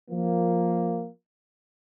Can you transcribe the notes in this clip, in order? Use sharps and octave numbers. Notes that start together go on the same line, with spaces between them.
F3 A#3